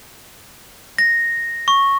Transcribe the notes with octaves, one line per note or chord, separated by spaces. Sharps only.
A#6
C#6